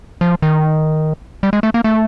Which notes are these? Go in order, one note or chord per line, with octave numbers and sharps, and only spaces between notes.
F3
D#3
G3
G#3
A3
A#3
A3